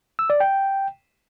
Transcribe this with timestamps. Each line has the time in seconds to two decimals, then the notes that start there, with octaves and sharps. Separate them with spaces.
0.19 E6
0.30 D5
0.40 G5